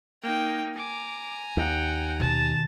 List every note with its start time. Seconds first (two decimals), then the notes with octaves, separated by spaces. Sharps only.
0.23 A#3 D#4 G5
0.77 G#5 A#5 D6
1.57 D#2 F#5 G5
2.20 B2 D#3 A5